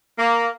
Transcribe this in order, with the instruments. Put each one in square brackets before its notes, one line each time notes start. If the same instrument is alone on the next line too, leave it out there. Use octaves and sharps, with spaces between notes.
[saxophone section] A#3